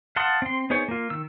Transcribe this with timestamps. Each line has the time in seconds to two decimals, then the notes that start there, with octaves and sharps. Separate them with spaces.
0.16 F5 F#5 A5 C6 D#6
0.42 C4 C6
0.70 B3 D#4 G#4 C5 C#5
0.88 A#3 F4
1.10 D#3 E6